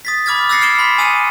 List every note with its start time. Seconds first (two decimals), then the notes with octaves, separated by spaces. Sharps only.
0.05 D#6 A6 B6
0.26 B5 D6 F6 G#6 A6
0.49 E6 F#6 A6 A#6 C7 C#7
0.61 F6 G#6 C7 D7 E7 G7
0.79 B5 C6 F#6 G#6 B6
0.98 G#5 D#6 E6 F#6 C#7 D#7